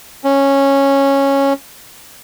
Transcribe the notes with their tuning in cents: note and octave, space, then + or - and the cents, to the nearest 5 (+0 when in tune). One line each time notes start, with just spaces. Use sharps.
C#4 -10